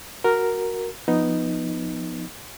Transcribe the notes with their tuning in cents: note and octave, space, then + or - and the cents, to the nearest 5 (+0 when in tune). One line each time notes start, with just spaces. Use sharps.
F#4 +0 A#4 +0
F3 +0 B3 +0 D#4 +0